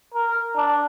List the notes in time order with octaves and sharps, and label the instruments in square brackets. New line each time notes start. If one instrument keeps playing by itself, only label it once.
[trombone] A#4
D4